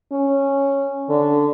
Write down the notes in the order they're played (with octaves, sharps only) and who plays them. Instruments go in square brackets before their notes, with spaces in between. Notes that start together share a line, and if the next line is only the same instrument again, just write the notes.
[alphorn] C#4
D3